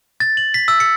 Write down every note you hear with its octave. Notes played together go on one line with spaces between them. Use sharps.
A6
F#7
B6
E6
C#7